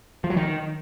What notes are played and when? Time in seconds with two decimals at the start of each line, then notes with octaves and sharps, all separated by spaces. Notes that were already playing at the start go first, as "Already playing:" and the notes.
0.24 F3
0.30 F#3
0.37 D#3